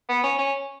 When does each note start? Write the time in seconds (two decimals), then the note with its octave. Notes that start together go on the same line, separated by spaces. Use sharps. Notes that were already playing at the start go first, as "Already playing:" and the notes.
0.09 B3
0.23 C#4
0.38 C#4